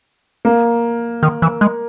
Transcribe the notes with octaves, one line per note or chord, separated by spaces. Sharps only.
A#3
D#3
E3
G#3